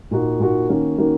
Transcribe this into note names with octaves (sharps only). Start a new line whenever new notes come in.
A#2 A#3 D#4 F#4
A#2 A#3 D#4 F#4
D#3 A#3 C#4 F#4
D#3 A#3 C#4 F#4